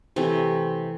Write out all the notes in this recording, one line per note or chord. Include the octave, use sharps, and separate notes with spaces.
C3 E3 A3